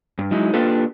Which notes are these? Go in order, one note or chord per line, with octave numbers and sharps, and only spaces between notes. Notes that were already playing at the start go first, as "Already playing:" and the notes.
G2
F#3 G#3 D#4 E4
A#3 D4 F4 G4 A4 B4